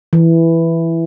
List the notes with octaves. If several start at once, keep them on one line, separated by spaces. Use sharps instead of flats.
E3